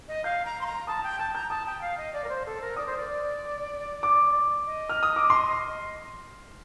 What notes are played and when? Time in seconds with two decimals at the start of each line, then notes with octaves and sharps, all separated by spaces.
0.08 D#5
0.24 F5 G6
0.45 A#5
0.61 C6
0.66 A#5
0.87 A5 D#6
1.03 G5
1.19 A5 G6
1.34 A#5 G6
1.50 A5 D#6
1.66 G5
1.81 F5
1.98 D#5
2.13 D5
2.24 A#4
2.29 C5
2.46 A4
2.62 A#4
2.76 D5 D#6
2.86 C5
2.97 D5
4.03 D6
4.67 D#5
4.89 F6
5.03 D#6
5.16 D6
5.30 C6